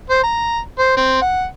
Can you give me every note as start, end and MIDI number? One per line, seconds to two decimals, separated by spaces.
0.10 0.20 72
0.23 0.59 82
0.79 0.92 72
0.97 1.20 60
1.22 1.44 78